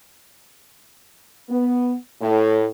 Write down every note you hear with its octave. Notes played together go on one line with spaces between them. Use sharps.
B3
A2